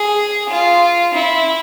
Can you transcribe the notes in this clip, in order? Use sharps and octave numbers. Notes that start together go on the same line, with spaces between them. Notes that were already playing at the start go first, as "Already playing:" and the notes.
Already playing: G#4
F4
E4